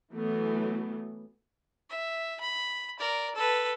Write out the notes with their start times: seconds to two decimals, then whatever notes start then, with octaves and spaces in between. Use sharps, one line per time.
0.13 E3 F#3 A3 B3
1.90 E5
2.41 B5
2.99 A#4 D5
3.35 A4 B4